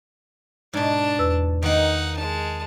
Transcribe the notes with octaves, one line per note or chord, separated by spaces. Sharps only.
G#2 B2 D4 A5
E2 B4 E6
D#3 A#3 D#4 F#5
G#3 A5